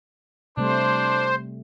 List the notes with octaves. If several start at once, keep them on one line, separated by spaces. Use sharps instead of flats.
C3 G3 A3 D4 C5